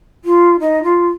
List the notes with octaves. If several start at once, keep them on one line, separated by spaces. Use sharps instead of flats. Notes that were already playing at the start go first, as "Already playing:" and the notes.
F4
D#4
F4